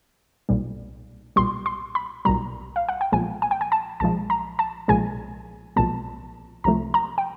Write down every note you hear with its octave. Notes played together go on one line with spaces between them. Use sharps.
B1 A#2 G3
B1 A#2 G3 C6
C6
B5
B1 A#2 G3 A#5
F5
F#5
G5
B1 A#2 F3 G#3 G#5
G#5
G5
G#5
A5
B1 A#2 F3 G#3 A5
A#5
A5
B1 A#2 F3 G#3 G#5
B1 A#2 F3 G#3 A5
C2 C3 F3 A3 A#5
A#5
G5